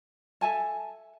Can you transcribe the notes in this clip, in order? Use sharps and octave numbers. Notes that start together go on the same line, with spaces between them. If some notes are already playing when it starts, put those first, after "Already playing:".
A4 E5 G#5 A5